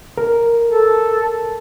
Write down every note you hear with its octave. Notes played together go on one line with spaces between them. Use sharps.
A#4
A4